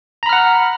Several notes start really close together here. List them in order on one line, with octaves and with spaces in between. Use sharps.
A#5 B5 F6 F#5